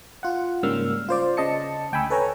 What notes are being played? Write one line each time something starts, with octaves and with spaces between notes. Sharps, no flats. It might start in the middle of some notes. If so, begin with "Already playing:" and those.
F4 F#5
G#2 C#3 G3 A#3 E6 F6
F4 C5 D5
C#3 D#5 A5 C#7
D2 G5 G#5 B5 E6
A4 B4 C#5 G#5 A#5